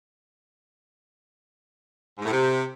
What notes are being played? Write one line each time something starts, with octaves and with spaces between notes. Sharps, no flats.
G#2
A2
C3